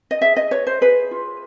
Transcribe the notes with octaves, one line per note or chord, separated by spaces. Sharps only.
D#5
G#4 E5
D#5
B4 C#5
C5
G#4 B4
F4